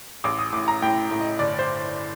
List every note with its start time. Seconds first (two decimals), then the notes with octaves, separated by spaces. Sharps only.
0.24 A1 D6
0.39 D#6
0.53 A2 D6
0.68 A#5
0.82 A2 G5
1.11 A2
1.21 D#5
1.39 G1 D5
1.59 C5